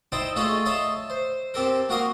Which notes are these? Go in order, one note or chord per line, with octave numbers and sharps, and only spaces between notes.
D#4 E4 C5 D#5 G5 A5
A3 F4 G#4 A4 C#5 D#5
C#5 D#5 E5 A5 C6
C5
C4 G4 A4 A#4
A#3 F#4 A#4 F5 C6 D#6